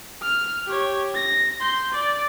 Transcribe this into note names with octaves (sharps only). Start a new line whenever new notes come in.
F6
G4 C#5
A#6
C6 G6
D5